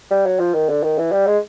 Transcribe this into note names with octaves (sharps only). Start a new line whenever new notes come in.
G3
F#3
F3
D#3
D3
D#3
E3
G3
G#3